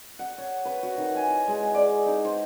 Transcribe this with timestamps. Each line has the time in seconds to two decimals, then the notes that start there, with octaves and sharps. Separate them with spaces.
0.19 F#5
0.38 C#5
0.65 B4
0.83 F#4
0.97 D#3
1.15 G#5
1.29 E4
1.47 G#3
1.61 G#4
1.75 D5
2.06 D#4
2.25 C5